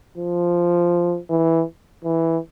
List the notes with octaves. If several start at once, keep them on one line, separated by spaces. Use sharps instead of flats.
F3
E3
E3